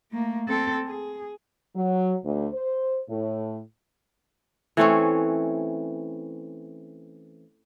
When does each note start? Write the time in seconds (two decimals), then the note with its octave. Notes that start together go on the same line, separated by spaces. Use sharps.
0.12 A3 A#3
0.48 C4 A4
0.86 G#4
1.74 F#3
2.23 D2
2.53 C5
3.09 A2
4.77 E3 A3 C4 C#4